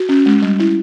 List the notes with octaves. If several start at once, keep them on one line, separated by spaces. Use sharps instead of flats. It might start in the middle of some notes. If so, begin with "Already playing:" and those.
Already playing: F#4
C#4
G#3
G3
E4